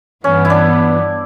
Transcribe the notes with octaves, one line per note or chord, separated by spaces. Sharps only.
G2 E3 B3 C#4
E4
D4